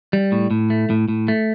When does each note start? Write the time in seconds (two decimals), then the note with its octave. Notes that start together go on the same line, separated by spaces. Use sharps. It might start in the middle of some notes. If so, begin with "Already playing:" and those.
0.13 G3
0.32 A2
0.51 A2
0.70 A3
0.90 A2
1.08 A2
1.28 A3